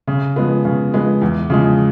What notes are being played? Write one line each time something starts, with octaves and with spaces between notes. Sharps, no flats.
C#3
F3 G#3 B3
C#3
F3 G#3 B3
E2
C#3 F3 G#3